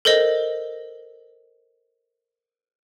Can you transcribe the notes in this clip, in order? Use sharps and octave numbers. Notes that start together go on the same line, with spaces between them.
A4 A#4 C5 D#5